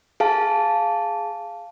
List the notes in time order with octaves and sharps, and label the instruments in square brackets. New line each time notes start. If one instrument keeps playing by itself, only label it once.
[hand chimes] G#4 F5 A5